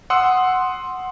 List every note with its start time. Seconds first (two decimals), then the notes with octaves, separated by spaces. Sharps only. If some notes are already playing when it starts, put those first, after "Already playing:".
0.10 F#5 C6 D#6 E6